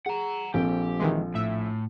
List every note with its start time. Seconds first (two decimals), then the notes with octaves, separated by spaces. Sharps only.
0.06 G#4 F#5 A#5
0.54 A#1 C4 G4 A4
0.99 D#3 E3 G#3
1.35 A2 E5